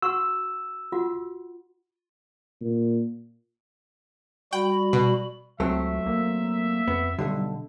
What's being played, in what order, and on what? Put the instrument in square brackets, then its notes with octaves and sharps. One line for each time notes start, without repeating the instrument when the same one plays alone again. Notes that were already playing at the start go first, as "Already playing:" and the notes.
[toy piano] F#4 F#5 C#6 [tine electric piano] E6
[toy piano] F4 F#4 F#5
[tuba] A#2
[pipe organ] G3 F#4 B5 [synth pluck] G5
[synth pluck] B2
[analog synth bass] C#2 [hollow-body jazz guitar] F#3 A3 C4 [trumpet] E5
[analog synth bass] A#3
[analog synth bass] F2 [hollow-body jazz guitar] B3
[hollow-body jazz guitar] B1 E2 D3 [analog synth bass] G3